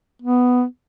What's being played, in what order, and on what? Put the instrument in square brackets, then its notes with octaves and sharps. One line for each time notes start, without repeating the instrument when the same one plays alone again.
[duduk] B3